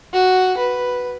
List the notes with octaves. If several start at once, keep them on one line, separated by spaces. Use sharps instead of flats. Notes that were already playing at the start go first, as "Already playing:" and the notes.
F#4
B4